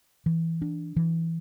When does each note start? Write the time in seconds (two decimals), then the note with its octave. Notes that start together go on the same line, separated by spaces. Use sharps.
0.26 E3
0.62 D4
0.96 E3